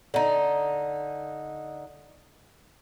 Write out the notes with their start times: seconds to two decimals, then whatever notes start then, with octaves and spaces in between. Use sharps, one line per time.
0.14 D3 D#4